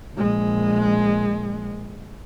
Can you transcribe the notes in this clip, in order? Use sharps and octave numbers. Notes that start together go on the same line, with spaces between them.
A#1 G#3